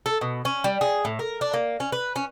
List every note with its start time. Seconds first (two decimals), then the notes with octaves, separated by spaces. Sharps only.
0.06 A4
0.21 B2
0.45 C#4
0.64 G3
0.81 G#4
1.05 A2
1.19 A#4
1.41 D4
1.54 A#3
1.80 C#4
1.92 B4
2.16 C#4